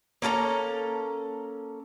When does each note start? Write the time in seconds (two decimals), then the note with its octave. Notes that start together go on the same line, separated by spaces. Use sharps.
0.22 A#3 C#4 A4 A#5